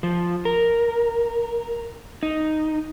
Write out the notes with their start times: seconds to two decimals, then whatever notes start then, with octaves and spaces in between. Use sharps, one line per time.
0.03 F3
0.45 A#4
2.23 D#4